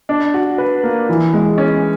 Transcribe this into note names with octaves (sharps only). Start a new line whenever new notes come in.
D4
F#4
B4
A#3
E3
G#3
C#4